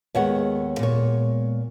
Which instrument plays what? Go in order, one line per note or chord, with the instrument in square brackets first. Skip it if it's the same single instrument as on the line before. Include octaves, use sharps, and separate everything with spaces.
[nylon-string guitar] D#2 C#5 F#5 [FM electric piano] G#3 B3
[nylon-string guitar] A#2 C#5